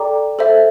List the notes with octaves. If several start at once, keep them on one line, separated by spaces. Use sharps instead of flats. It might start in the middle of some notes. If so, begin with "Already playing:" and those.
Already playing: A4 D5 G5 A#5 D6
A4 C5 E5